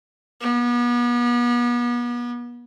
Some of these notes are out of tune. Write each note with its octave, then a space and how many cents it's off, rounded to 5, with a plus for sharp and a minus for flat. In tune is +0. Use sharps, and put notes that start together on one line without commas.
B3 -35